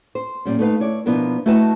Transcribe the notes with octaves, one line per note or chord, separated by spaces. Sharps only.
C5
A#2 G3 C#4
A3 D#4 B4 F5
E4 C#5 D5
B2 F3 B3 D4 E4 A#4
A3 E4 F#4 B4 D#5 A5